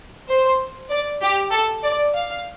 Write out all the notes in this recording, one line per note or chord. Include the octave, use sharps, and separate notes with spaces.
C5
D5
G4
A4
D5
F5